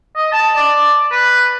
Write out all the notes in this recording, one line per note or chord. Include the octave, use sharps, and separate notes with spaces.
D#5
A5
D5
B4